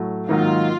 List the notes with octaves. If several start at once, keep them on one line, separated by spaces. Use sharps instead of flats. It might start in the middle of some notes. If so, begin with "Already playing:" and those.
Already playing: A2 F#3 A3
G#2 D#3 F#3 A#3 D#4 F4